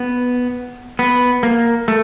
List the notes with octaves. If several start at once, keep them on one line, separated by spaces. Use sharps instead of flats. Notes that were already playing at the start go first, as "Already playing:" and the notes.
Already playing: B3
B3
A#3
A3